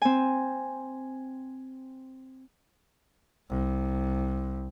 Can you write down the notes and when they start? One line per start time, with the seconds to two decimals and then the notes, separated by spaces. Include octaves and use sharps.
0.02 C4 G#5
3.49 C2